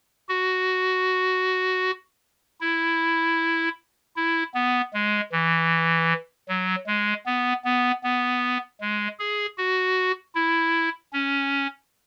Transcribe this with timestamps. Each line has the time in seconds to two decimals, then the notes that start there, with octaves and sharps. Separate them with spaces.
0.29 F#4
2.61 E4
4.16 E4
4.54 B3
4.94 G#3
5.32 E3
6.48 F#3
6.87 G#3
7.26 B3
7.64 B3
8.03 B3
8.81 G#3
9.19 G#4
9.58 F#4
10.35 E4
11.13 C#4